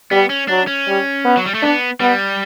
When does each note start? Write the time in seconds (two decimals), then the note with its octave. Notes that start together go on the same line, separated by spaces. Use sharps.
0.11 G3 B3
0.30 C#4
0.48 F#3 D4
0.67 C#4
0.87 G3
1.25 B3
1.37 F#3
1.46 G3
1.54 A3
1.62 B3 D4
2.00 G3 B3